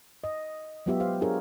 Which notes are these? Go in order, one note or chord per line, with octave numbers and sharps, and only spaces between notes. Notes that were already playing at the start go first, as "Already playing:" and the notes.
D#5
F#3 G#3 B3 F4 G4 E5
G4 C5 F5
D4 F4 G4 G#4 A#4 C#5